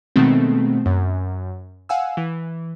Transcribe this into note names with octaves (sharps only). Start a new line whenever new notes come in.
B2 D#3 G#3 A3 B3 C4
F#2
F5 F#5 G#5 E6
E3